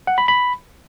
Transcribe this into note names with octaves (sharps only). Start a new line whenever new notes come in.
F#5
B5
B5